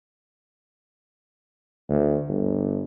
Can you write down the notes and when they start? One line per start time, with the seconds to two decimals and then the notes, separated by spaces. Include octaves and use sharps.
1.89 D2
2.28 G1